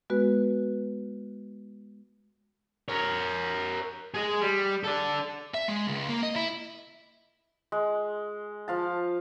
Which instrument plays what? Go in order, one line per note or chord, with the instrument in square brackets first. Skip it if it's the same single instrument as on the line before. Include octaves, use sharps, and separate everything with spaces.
[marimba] G#3 B3 F#4 B4
[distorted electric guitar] A#4 C#5
G#4 D#5
G3
A4 D5
E5
G#3
C#2
A#3
D#5
E4
[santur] G#3
F3 F5 A5